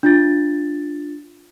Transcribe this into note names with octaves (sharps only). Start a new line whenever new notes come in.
D4 F4 A6